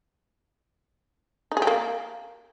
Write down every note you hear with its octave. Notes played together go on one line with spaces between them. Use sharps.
D#4
G#4
G4
A#3